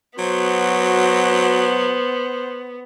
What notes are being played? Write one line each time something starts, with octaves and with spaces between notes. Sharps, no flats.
F#3 B3 F#4 C5